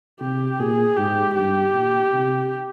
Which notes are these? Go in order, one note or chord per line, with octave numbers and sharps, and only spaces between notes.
C3 G4
A#2 G#4
G#2 G4
G2 G4
A#2
C3